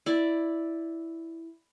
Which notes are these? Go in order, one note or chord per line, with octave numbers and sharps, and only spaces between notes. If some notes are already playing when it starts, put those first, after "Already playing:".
E4 D5